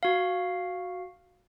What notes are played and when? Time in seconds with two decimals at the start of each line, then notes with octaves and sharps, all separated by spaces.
0.03 F#4 F5